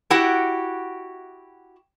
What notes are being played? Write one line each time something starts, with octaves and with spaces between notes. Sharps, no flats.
E4 F#4 G4 F#5